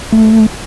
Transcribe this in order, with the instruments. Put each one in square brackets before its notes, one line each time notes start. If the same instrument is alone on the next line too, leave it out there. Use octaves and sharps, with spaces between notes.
[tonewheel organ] A3